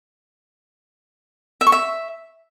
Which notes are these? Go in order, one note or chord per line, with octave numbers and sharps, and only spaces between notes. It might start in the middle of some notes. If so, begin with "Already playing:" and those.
E5
C#6
E5